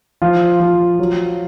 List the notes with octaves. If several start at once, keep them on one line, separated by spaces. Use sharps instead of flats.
F3 F4
F3
F#3